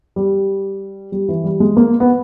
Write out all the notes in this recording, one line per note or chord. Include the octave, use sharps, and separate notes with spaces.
G3
G3
E3
G3
G#3
A#3
B3